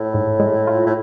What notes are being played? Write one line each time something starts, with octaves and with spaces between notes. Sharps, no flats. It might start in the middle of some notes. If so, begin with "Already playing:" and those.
Already playing: A2
G#2
G#3
F4
A2